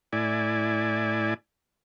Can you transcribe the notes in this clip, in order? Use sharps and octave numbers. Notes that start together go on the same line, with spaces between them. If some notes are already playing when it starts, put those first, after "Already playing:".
A2 E4 D5 G#5